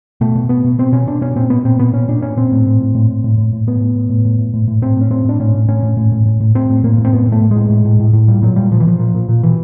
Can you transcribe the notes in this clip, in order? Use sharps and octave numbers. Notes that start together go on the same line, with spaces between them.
B2 A3
B2
B2 B3
B2
B2 C4
B2 C#4
B2 D4
B2 C#4
A#2 C4
A#2 B3
A#2 C4
A#2 B3
A#2 C#4
A#2 D4
A#2 C#4
A#2 C4
A2
A2
A2
A2
A2
A2
A2
A2
A2 B3
A2
A2
A2
A2
A2
A2
A2
A2 C4
A2 C#4
A2 C4
A2 D4
A2 C#4
A2
A2 C#4
A2
A2
A2
A2
A2
A2 C4
A2
A2 A#3
A2
C4
A2 B3
A2
A3
A2
G#3
A2
A2
A2
A2
A2
A#2 G3
A#2 F#3
A#2 G3
A#2 F3
E3
A#2 F3
A#2
A#2
A#2
B2 E3